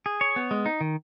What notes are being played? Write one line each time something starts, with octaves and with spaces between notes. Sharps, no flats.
G#4
C#5
B3
G#3
D#4
D#3